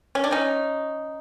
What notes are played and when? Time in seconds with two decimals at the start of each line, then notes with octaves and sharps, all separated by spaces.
0.15 C#4
0.24 D4
0.31 C#4 D#4